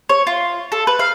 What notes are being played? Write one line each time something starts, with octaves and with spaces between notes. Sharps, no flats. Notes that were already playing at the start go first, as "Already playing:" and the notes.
C#5
F4
A4
B4
F5